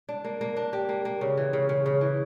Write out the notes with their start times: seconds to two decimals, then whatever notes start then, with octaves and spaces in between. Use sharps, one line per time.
0.09 D4
0.24 A#3
0.41 A#3
0.57 D4
0.73 G4
0.89 A#3
1.05 A#3
1.21 C#3
1.37 E3
1.53 C#3
1.69 C#3
1.86 C#3
2.01 E3